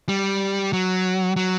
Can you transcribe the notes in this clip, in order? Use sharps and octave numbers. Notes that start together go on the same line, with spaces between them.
G3
F#3
F#3